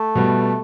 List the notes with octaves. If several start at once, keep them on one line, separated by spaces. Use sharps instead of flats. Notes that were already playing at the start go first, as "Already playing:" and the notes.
Already playing: A3
B2 G3 B3